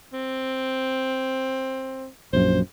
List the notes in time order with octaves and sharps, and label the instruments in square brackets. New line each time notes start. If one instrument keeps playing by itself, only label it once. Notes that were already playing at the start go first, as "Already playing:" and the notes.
[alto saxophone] C4
[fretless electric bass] A#1 F#2 [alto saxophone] C5